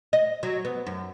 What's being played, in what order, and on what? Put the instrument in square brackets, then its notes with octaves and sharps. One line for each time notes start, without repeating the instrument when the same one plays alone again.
[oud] D#5
F#3
B3
F#2